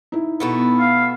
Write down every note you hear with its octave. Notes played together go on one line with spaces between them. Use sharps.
D#4 E4
B2 A3 B3
F5